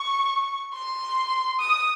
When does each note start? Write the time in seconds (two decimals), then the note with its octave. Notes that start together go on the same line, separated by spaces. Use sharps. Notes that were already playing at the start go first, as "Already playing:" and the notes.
Already playing: C#6
0.73 C6
1.59 D#6